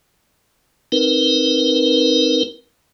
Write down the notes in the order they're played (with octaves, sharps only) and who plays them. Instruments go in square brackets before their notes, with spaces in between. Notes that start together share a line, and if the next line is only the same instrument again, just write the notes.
[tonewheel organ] C4 D#4 A#4 B4